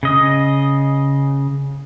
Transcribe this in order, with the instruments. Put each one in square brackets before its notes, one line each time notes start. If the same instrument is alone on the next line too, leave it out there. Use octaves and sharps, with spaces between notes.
[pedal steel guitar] C#3 D#5 D#6